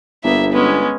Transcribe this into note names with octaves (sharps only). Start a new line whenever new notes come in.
G1 A#3 B3 E5
G#3 B3 C#4